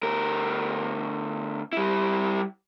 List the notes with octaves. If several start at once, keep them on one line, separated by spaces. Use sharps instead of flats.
D2 A#4
G3 E4